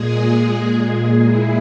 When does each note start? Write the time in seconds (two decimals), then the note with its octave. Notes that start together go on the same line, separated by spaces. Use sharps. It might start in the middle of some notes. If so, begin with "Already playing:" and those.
Already playing: A#2 G#3 G#4
0.78 G#4
1.24 E4